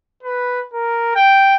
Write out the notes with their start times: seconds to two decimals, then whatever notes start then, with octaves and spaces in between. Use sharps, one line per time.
0.23 B4
0.73 A#4
1.15 G5